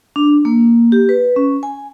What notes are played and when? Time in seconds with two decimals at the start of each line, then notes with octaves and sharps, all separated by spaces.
0.16 D4
0.45 A#3
0.92 G4
1.09 B4
1.36 C#4
1.63 G#5